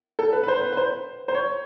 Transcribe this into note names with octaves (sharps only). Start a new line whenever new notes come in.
A4
B4
B4
C5
B4
B4
C5
C5
C#5